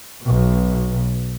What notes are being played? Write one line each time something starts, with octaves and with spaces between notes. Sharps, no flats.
B1 B2